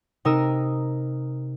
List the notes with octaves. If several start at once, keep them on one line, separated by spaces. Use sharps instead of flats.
C3 D#4 A#4 D#6 E6